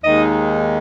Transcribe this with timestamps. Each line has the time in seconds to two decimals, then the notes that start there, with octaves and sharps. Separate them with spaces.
0.03 D#2 D#3 G#3 D#4 D#5